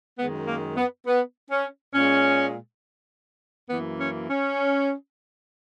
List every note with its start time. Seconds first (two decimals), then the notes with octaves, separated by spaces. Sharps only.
0.19 F#2 D#3 G#3 B3
0.48 A#3
0.77 B3
1.07 B3
1.51 C#4
1.95 A#2 G#3 C#4
3.70 F#2 E3 A#3 B3
4.00 C#4
4.30 C#4